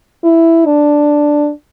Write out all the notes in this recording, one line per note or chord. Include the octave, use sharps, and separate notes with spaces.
E4
D4